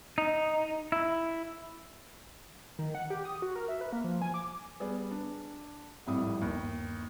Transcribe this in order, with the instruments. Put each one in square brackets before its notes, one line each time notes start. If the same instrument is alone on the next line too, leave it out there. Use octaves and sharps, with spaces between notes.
[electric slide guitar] D#4
E4
[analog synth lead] D#3
F#5
G4
D#6
F#4
A#4
E5
B4
A#3
F3
G#5
D6
[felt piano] G3 B3 G#4 D5
D4
G#1 F2 A2 G3 D#6
G1 D#2